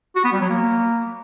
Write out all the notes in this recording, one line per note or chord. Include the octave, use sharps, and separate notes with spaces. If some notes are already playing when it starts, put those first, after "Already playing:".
F#4
B3
G3
F#3
A#3